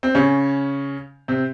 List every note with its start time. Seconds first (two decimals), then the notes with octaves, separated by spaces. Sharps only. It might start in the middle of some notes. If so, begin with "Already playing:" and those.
0.03 C4
0.15 C#3 C#4
1.28 C3 C4